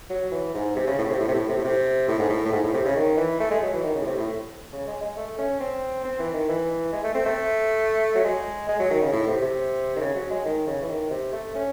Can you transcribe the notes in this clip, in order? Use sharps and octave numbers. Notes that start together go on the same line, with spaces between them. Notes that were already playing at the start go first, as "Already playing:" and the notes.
F#3
E3
G#2
C3
C#3
A2
C#3
C3
A2
C3
A2
C3
A2
C3
A2
G#2
A2
A2
G#2
A2
C3
C#3
D#3
E3
A3
G#3
F#3
E3
D#3
C#3
A2
C3
A2
C#3
G#3
G#3
A3
C#4
C4
C4
E3
D#3
E3
G#3
A3
C4
A3
F#3
G#3
G#3
F#3
D#3
C#3
A2
C3
C3
D#3
C#3
F#3
G#3
D#3
C#3
E3
D#3
C3
A3
C#4